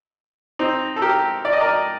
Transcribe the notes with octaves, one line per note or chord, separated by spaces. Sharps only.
C4 D#4
A4
G4 A#4
D5
D#5
A#4 D5